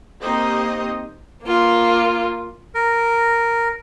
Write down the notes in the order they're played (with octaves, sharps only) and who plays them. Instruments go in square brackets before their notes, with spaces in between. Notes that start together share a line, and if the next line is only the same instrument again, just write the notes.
[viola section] A#3 C4 D#4 G4 C5 D#5
[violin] A#3 F4
[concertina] A#4